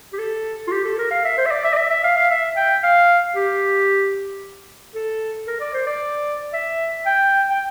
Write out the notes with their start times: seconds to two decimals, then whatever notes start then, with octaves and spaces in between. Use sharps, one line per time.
0.12 G4
0.18 A4
0.67 F4
0.72 G4
0.84 A4
0.98 A#4
1.11 F5
1.24 E5
1.37 C5
1.46 E5
1.51 D5
1.64 E5
1.73 D5
1.77 E5
1.90 E5
2.04 F5
2.17 F5
2.30 E5
2.56 G5
2.83 F5
3.36 G4
4.95 A4
5.47 A#4
5.60 D5
5.73 C5
5.87 D5
6.53 E5
7.06 G5
7.49 G5